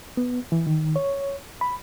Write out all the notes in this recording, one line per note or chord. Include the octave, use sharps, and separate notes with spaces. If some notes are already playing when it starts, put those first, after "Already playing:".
B3
E3
D#3
C#5
B5